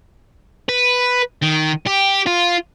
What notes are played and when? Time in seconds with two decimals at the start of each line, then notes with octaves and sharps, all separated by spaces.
0.69 B4
1.43 D#3
1.87 G4
2.27 F4